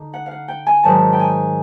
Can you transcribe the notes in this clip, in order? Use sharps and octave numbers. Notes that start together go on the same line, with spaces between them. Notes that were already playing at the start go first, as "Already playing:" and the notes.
Already playing: D3 D#4
F#5
F5
F#5
G5
G#5
G#2 D#3 F#3 A5
G5
G#5